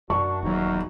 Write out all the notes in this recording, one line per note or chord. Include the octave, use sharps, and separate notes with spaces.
F#2 D4 F#4 C#6
D#1 E2 F#3 D#4